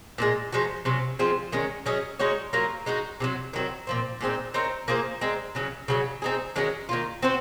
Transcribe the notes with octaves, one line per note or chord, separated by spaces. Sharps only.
A#2 F3 G#3
F3 G#3 D#4 F#4
C3 F#3 C#4
F3 G#3 C4 F4
D#3 G#3 C#4
F#3 C#4 G#4 D#5
G#3 D#4 F#4 C#5
F#3 A#3 F4 A#4
G#3 D#4 F#4
C3 D#3 F#3
D#3 F#3 C4
A#2 F3 C4
A#2 G#3 C4 D#4
C4 D#4 A#4 C#5
A#3 F4 G#4 C5
G#3 C4 D#4
C#3 F#3 C#4
C#3 F#3 C#4
C4 D#4 G#4
D#3 G#3 C#4 F#4
D#3 A#3 F4
C4 F#4 C5